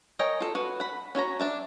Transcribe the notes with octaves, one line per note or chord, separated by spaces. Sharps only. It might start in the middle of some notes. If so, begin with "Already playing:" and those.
A#4 C#5 D#5 G5 G#5
F4 A4
F#4 B4
F#5 B5
C#4 F#4 C#5 A#5
D4 E5 A5